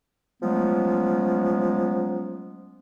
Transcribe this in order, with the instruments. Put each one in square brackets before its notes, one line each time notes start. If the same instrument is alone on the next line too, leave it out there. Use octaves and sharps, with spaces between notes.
[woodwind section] F3 F#3 G#3 A3 B3 C#4